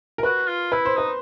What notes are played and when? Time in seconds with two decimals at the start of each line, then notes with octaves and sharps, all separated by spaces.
0.18 A#4
0.23 F#4 B4
0.48 F4
0.72 E4 B4
0.85 C5
0.96 D#4 B4